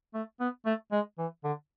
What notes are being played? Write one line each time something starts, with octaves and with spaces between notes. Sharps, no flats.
A3
B3
A3
G#3
E3
D3